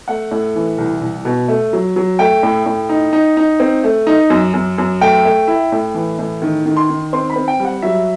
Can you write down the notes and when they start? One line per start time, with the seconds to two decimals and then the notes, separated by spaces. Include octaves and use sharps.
0.08 A3 F#5
0.31 A2
0.56 E3
0.78 C2
1.01 C2
1.25 B2
1.48 A3
1.73 F#3
1.96 F#3
2.19 A3 G5
2.43 A2
2.66 A2
2.89 D#4
3.13 D#4
3.37 D#4
3.60 C4
3.84 A3
4.07 D#4
4.30 F#2
4.54 F#2
4.78 F#2
5.01 A3 G5
5.25 A3
5.47 E4
5.72 A2
5.94 E3
6.19 A2
6.42 D#3
6.66 D#3
6.77 C6
6.90 D#3
7.13 C4 C6
7.30 B5
7.36 C4
7.48 G5
7.60 G3
7.65 F#5
7.82 F#3 E5